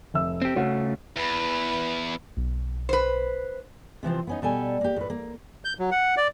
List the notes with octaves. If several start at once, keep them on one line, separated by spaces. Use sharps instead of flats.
F1 E5 E6
C4 G4
C#3 A3 C#4 F#4
E2 B4
B1
B4 C5
C3 E3 F3 C4
B3 C#4 D#4
B2 G3 A4 G#5
A#3 G4
A2 B4
A#3
G6
F#3
F#5
D5